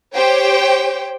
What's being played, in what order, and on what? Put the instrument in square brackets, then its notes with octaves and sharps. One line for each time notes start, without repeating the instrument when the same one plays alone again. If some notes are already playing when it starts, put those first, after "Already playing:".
[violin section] G4 C5 C#5 G5